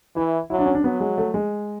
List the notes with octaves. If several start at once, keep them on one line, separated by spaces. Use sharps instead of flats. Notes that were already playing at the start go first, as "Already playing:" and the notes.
E3 E4
F#3 E4
D4
C#4
D4
F#3 B3
G#3
A3
G#3